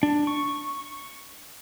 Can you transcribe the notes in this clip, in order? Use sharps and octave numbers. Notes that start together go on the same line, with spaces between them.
D4
C#6